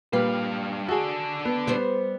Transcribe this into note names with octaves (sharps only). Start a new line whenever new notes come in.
G2 A#2 G3 B4 F5
D4 F#4 G#4 A4
B3
G3 B3 B4 C5